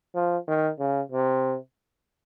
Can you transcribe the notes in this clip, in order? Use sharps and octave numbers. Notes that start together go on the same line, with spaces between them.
F3
D#3
C#3
C3